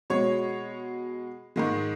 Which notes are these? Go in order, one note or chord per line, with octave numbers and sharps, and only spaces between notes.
B2 G#3 C#5
G#2 D#3 G#3